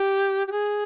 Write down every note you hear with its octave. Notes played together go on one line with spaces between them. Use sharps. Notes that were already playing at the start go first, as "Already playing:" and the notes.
Already playing: G4
G4
G#4